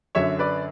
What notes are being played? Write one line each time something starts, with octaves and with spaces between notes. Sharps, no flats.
F#2 D3 F#3 C#5 E5
B4 D5